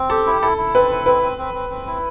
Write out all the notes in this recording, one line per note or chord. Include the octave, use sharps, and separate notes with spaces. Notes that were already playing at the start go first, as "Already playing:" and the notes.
Already playing: C4
G4 A4
E4
E4 A4
E4
C4 B4
E4
C4 B4
C4
C4
C4
C4
E4